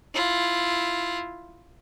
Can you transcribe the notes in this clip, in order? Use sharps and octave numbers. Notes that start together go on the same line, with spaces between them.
E4 F4